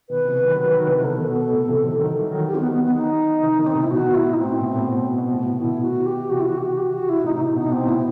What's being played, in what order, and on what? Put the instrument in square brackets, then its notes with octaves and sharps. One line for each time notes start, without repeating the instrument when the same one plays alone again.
[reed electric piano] B2 D#3 [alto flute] B4
[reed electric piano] C3 E3
D#3 F#3
D#3 F#3
D#3 F#3
C3 E3
[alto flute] B4
[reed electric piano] B2 [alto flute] A4
[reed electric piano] B2
A2 C3
C3 E3
D#3 F#3
E3
D#3 F#3
E3 G3
D#3 F#3
[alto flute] G4
C4
B3
B3
B3
D#4
[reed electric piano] C3 E3
B2 D#3
[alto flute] C4
[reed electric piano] A2 C3 [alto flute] D#4
[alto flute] E4
[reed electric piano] B2 [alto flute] F#4
[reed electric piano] A2 [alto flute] E4
[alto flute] D#4
[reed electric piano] A2 [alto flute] C4
[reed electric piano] A2
B2
A2
B2
A2
B2
A2 C3
[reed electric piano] B2 D#3 [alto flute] E4
[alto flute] F#4
G4
[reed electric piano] C3 E3 [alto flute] F#4
[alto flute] E4
F#4
G4
F#4
G4
F#4
E4
[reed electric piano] A2 C3 [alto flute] D#4
[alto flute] D#4
[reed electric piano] B2 [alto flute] E4
[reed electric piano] B2 [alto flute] D#4
[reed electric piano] B2 [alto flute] C4
[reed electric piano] A2 C3 [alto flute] E4